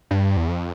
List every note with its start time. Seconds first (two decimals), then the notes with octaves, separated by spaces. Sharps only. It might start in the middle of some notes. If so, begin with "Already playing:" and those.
0.11 G2
0.37 E2
0.49 F2